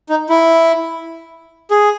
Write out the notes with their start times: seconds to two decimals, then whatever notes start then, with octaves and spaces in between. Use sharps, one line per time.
0.09 D#4
0.30 E4
1.71 G#4